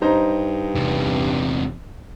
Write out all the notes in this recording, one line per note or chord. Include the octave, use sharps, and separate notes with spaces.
G2 D#4 C5 A#5
E2 C3